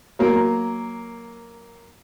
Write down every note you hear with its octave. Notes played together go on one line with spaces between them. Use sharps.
F#3 A#3